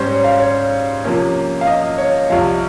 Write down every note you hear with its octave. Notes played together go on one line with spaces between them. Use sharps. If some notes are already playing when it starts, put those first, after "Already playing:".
Already playing: G#2 G3 C#4 C5
C#5
F5
C#5
C3 F3 A#3 C#4
F5
D#5
C#5
C2 C3 F3 F5